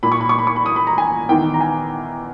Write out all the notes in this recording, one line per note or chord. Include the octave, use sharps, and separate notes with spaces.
A#2 B5
C#6
B5
C#6
B5
C#6
B5
D#6
B5
A#5
G#5
E2 D#3 G5
A#5
G#5